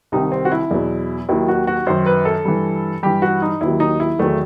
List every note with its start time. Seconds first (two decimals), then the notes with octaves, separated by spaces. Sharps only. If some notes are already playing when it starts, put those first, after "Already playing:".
0.12 C2 C3 D#3 D#4
0.32 C4
0.45 F#4
0.52 E4
0.71 E2 B2 F#3
1.29 D#2 D#3 F#3 E4
1.48 F#4
1.67 F#4
1.87 F#2 D#3 F#3 C5
2.06 B4
2.25 A4
2.45 G2 E3
3.03 G2 E3 G4
3.22 F#4
3.42 D#4
3.61 D#2 D#3 F#3 E4
3.80 D#4
4.00 E4
4.19 E2 D#3 F#3 A3